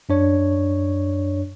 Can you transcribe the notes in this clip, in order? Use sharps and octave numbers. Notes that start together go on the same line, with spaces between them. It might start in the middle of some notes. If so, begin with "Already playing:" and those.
F#2 D4 C#5